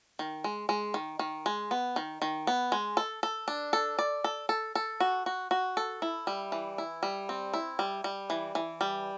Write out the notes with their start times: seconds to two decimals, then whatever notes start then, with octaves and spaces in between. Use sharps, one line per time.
0.19 D#3
0.44 G#3
0.69 G#3
0.94 D#3
1.19 D#3
1.46 G#3
1.71 B3
1.96 D#3
2.22 D#3
2.47 B3
2.72 G#3
2.97 A4
3.23 A4
3.48 D4
3.73 A4
3.99 D5
4.24 A4
4.49 A4
4.75 A4
5.00 F#4
5.26 F#4
5.51 F#4
5.77 A4
6.02 E4
6.27 G3
6.52 E3
6.78 E4
7.03 G3
7.29 C4
7.53 E4
7.79 G3
8.04 G3
8.30 E3
8.55 E3
8.81 G3